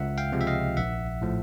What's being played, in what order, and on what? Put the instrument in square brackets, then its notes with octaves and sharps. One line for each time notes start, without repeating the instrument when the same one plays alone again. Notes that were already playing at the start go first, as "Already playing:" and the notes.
Already playing: [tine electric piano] C#2 E5 F#5
F5 G5
C3 F3 G#3 C4
E5
D#5 F5
A#1 E5 F#5
A2 F3 A3